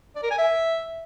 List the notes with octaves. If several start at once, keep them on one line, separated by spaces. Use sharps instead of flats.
D5
A#4
G#5
E5